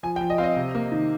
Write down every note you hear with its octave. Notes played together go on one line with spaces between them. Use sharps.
F3 G#5
G5
F3
D#5
C4 F5
D#5
C3
A#3
D#3